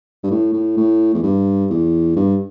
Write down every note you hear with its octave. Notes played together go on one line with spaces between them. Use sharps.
G2
A2
A2
A2
E2
G2
E2
G2